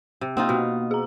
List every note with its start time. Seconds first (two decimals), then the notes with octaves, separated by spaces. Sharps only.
0.21 C3
0.37 A#3 C4 D#4 F4
0.49 B2
0.91 G#4 A#5